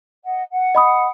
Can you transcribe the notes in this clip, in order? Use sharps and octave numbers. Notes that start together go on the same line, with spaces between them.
D#5 F#5
F#5
D#5 B5 D#6